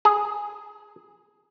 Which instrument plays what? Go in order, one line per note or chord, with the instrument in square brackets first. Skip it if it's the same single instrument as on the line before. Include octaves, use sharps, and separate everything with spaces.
[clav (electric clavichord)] G#4